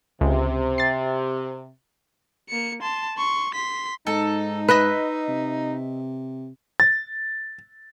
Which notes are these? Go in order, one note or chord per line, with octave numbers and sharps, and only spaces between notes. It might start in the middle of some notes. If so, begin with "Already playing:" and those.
C#2 C3
A6 C7
A#3 C#7
A5 C6
C6 C#6
C6 B6
G#2 D#4 A4
B4 D#5 E5 F#6
C3
A6